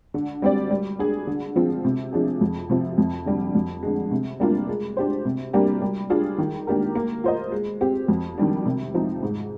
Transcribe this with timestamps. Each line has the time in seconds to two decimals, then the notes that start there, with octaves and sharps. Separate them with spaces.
0.14 D3
0.42 G3 C4 G4 D5
0.71 G3
0.99 D4 G#4
1.27 D3
1.56 F3 G#3 C4 F4
1.85 C3
2.13 F3 G#3 D4 G#4
2.41 F2
2.70 C3 F3 C4
2.98 F2
3.26 D3 G3
3.55 F2
3.83 D3 G#3
4.11 C3
4.40 G3 A#3 D4 F4
4.68 G#3
4.97 D4 G4 C5
5.25 C3
5.53 G3 A#3 D4 G4
5.82 G3
6.10 D4 F4 G#4
6.38 D#3
6.67 A#3 D4 G4 A#4
6.95 A#3
7.24 F4 C5 D#5
7.52 G#3
7.81 C4 G4
8.08 F2
8.38 D#3 G3 D4
8.66 C3
8.94 F3 C4 D#4
9.23 G#2